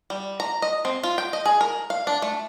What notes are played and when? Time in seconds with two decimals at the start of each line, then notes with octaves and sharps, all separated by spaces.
0.10 G3
0.40 A#5
0.62 D#5
0.85 C4
1.03 F4
1.18 G5
1.33 D#5
1.45 G#4
1.61 A#4
1.90 F5
2.07 D4
2.22 A3